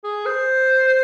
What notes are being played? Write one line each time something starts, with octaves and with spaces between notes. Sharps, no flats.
G#4
C5